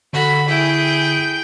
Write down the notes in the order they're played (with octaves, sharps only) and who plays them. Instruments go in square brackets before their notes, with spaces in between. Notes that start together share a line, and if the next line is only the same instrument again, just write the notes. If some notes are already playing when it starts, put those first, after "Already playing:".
[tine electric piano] D3 [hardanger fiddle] F#4 [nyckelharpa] A4 B5
[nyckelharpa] E4 G#4 [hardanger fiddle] G5